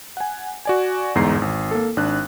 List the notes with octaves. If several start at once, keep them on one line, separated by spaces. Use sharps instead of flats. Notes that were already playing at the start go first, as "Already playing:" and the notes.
F#5 G#5
F#4 D5 G#5
G1 E2 G#2 A#5 C7
G#1
A#3 A4
G#1 D4 F#6